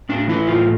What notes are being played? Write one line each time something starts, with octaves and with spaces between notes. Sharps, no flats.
A2 D4
E3 E4
A2 F4